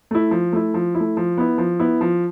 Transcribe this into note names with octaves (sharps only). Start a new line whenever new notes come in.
A3 E4
F3
A3 E4
F3
E4
A3
F3
B3 E4
F3
B3 E4
F3